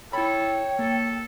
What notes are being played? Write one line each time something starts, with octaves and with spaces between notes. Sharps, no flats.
E4 A4 C#5 G5 B5
A#3 A4